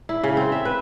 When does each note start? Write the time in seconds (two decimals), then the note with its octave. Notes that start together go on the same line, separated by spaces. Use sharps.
0.09 E4
0.24 C#3
0.37 C4
0.52 E5
0.65 B4